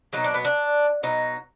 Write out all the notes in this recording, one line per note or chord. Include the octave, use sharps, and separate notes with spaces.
B2 F#3 D#4
D4
B3
D4
B2 F#3 D#4